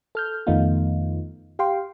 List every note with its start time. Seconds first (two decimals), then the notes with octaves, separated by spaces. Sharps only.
0.15 A4 F6 G6
0.47 F2 D#3 A3 B3 D#4 F4
1.59 G4 F5 G5 C6